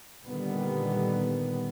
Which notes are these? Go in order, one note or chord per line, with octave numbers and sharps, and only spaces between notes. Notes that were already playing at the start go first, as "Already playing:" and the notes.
A#2 D3 D#3 G3 B3